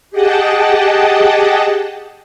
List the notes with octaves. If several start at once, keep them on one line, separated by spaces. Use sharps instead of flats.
G4 G#4 D#5 F#5 G5 A5